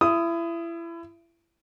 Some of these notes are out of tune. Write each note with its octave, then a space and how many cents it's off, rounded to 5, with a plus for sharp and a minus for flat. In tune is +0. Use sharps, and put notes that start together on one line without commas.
E4 +30 D#6 +5